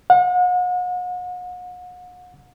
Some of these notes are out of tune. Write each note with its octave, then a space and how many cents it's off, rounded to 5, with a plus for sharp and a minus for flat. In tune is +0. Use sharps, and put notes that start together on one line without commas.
F#5 -40